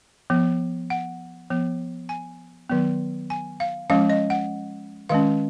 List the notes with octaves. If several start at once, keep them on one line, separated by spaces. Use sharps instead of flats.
F3 B3
F#5
F3 B3
G#5
D#3 F#3 B3
G#5
F5
F3 G#3 C#4 F5
D#5
F#5
D#3 G#3 C#4 F5